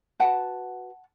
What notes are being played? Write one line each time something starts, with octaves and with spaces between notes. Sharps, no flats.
F#4 B4 F#5 A5